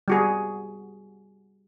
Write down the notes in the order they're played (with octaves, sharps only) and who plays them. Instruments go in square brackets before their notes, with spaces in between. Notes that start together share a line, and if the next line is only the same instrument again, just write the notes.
[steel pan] G3 F#4 G#4